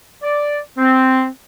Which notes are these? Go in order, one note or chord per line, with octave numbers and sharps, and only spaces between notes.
D5
C4